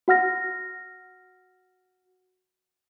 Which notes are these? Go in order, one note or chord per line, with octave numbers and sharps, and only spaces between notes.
F#4 F#5 F6 A#6